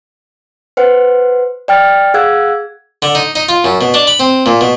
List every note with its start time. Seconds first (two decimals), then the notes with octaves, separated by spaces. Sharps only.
0.77 B4 C5 F#5
1.68 D5 G5 F6 A6
2.14 G#4 F5 F#5 E6 F#6 G#6
3.02 D3
3.15 D#4
3.36 D#4
3.49 F4
3.64 F#2
3.81 B2
3.94 D4
4.07 B5
4.20 C4
4.46 A#2
4.61 B2